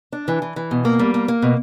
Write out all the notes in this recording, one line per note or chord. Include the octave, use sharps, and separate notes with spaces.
D4
E3
E3
E3
B2
A#3
G3
A#3
A#3
B2